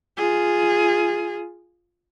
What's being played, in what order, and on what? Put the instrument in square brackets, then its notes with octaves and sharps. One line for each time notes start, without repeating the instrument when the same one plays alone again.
[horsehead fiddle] F4 G#4